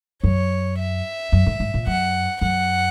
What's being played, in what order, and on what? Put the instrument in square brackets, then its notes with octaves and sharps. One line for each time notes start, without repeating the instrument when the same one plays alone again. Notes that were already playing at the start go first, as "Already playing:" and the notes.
[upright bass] F#2 [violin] C#5
[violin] E5
[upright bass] F#2
G#2
G#2
A#2
[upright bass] F#2 [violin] F#5
[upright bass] F#2 [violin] F#5